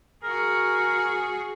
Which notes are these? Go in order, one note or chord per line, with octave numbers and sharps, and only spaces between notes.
F#4 G#4 A#4